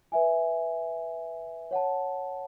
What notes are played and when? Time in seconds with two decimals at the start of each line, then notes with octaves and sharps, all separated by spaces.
0.12 B4 E5 G#5
1.71 C#5 F#5 A5